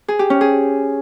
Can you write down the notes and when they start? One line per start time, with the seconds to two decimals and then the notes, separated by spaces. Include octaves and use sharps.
0.08 G#4
0.19 G4
0.30 C#4
0.41 G#4